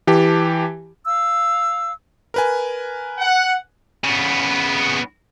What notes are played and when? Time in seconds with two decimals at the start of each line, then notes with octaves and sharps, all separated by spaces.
0.07 E3 G4 A5
1.07 F5 E6
2.34 A#4 B4 G#5
3.18 F#5
4.04 C#3 B3